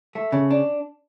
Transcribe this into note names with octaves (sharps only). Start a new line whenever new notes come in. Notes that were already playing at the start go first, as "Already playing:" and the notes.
A3
C#3
D4